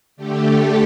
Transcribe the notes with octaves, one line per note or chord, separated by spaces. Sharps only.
D3 A3 G4
A4